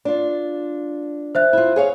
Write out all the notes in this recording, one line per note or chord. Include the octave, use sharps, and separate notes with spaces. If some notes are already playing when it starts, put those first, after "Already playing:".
D4 F4
C5 E5 F#6
E4 F4
G#4 C#5 F5